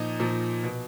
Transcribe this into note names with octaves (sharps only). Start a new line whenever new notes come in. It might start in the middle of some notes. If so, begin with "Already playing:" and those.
Already playing: A#2 F3 D#4
A#2 F3
B2